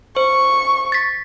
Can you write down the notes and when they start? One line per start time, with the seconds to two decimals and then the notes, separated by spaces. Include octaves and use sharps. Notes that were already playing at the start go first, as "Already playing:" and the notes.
0.16 C5 C#6
0.92 A6 B6